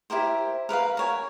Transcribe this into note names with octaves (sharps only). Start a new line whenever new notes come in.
E4 G4 A#4 C5
A#4 B4 D5 F5
A#4 C#5 G#5